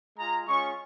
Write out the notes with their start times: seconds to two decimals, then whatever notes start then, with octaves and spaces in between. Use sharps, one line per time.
0.18 G#3 F4 A#5
0.47 G#3 C#4 F4 C#6